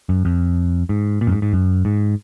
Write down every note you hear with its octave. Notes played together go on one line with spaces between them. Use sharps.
F#2
F2
G#2
A#2
F#2
G#2
G#2
F#2
G#2